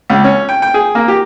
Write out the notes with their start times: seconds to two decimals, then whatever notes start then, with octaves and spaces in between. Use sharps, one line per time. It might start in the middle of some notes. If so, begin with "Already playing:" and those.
0.10 C#2
0.24 C#4
0.49 G5
0.62 G5
0.74 G#4
0.95 A#3
1.08 G4